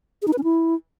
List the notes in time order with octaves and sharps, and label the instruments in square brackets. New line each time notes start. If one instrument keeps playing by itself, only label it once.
[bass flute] G#4
D#4
B4
C#4
E4